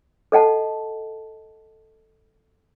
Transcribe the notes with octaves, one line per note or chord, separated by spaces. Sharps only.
A4 D#5 F#5 A5